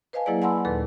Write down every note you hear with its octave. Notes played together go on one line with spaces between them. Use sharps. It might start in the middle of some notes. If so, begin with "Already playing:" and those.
B4 C5 D#5 F5 G#5 A5
F#3 A#3 E4 G#4 B4 D5
F#5 G#5 A5 B5 C6 E6
D#2 A#2 D#3 A4 B4